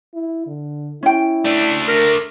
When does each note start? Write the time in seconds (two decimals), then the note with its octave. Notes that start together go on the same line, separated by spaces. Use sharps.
0.14 E4
0.46 D3
1.03 C#4 E4 G5
1.45 A3 D4 D5
1.88 A#4